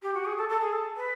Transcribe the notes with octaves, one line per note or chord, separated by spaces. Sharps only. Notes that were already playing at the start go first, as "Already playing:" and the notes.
G4
F#4
G#4
A4
A4
G#4
A4
B4